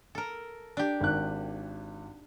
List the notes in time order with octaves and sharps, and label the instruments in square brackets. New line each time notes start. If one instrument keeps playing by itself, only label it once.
[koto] A4 A#4
D4 G4
[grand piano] G#1 F#6